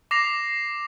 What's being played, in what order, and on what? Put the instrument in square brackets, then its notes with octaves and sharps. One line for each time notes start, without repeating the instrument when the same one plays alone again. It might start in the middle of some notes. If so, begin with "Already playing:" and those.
[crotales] D6 A#6 C7 F7